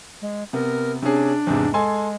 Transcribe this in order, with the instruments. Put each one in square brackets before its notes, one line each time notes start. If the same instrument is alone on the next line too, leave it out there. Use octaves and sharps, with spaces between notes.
[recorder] G#3
[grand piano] C3 B3 [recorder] A#4
[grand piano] C3 C#4 G#4 [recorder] D4
[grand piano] E2 G#2 C3
[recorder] G#3 [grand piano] A4 G#5 C6